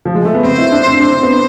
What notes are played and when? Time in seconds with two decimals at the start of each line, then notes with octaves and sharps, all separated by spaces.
0.05 F3
0.15 G#3
0.25 A3
0.35 B3
0.43 C4 C5
0.58 E4
0.72 D4
0.87 C4
1.00 D4 C5
1.12 C4
1.23 B3